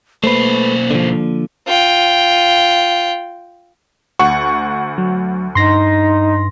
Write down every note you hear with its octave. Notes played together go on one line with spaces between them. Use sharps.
B1 A3 A#3 B4 C5
D3 F3
F4 G5
D2 F#5 C#6
F#3
G2 D#4 C6 A#6